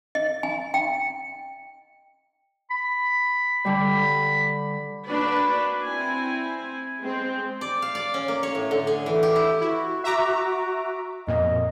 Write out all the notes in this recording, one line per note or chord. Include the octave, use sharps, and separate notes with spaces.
D#5
G#5
G5
B5
D3 G3
A#3 D4 F#4 B4 D5 B5
C4 E4 G#5
G#3 C4
D5
F5
D5
C#4
A#3
C#5
A2
D3
G#4
E3
G4
E4
E4 F#4
E5 A#5 D6
F2 A#2 D#5